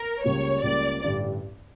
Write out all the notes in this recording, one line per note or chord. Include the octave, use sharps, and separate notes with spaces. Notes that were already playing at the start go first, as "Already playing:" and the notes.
Already playing: A#4
C#2 C#3 G3 A#3 C#5
C#2 C#3 G3 A#3 D5
A1 G2 D3